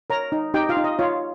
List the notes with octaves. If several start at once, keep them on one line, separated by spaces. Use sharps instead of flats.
A#4 C#5 A#5
D#4
D#4 G4 G5
F4 F5
D#4
D#5
F4 C#5 F5